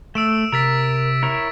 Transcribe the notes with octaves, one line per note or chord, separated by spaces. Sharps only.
A3 E6 D7 E7
C3 A#4 E6 A6 B6
E4 A#4 C#5